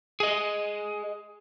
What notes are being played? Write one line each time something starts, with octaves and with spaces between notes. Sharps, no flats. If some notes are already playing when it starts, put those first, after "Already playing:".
G#4 D#5